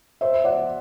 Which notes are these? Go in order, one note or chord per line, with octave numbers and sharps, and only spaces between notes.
C5 E5
D5 F#5